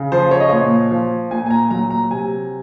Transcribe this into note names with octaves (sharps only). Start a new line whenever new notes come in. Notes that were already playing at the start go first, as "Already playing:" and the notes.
Already playing: C#3
F3 C5
C#5
D#5
A#2 C#5
F3
A#2 G#5
G#5
A#5
F#3 A#5
A#5
C3 G#5